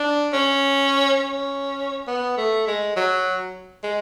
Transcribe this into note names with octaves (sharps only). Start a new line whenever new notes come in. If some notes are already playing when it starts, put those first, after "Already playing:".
Already playing: D4
C#4
C#4
B3
A3
G#3
F#3
G#3